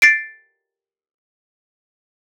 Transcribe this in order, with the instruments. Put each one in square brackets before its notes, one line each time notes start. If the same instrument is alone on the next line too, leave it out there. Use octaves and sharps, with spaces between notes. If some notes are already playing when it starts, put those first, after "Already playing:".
[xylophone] A6 C7 D7